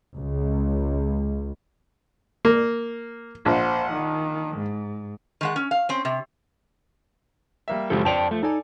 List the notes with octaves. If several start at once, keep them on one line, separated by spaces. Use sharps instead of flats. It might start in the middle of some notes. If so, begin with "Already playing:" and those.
C#2
A#3
A#1 C5 F#5
D#3
G#2
D#3 G#3 F#5
C#4
F5
C4 C#4
C3
G3 A#3 E5
F#2 C#3 F3 G#3 G4 A4
F2 C5 D5 G5 A5 F7
F3 A3
D#4 A4 D5 G#5